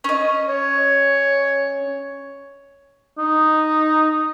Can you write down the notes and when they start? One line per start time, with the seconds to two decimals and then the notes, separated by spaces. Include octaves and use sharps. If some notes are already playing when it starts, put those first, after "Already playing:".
0.04 C#4 D#5
0.49 C#5
3.18 D#4